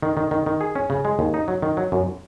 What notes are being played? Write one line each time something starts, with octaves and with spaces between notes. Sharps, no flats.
D#3
D#3
D#3
D#3
G#4
C#4
C#3
G#3
D#2
D#4
F#3
D#3
F#3
F#2